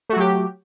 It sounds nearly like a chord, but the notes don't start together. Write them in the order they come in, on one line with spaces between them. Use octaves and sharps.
A3 F#4 F#3 G4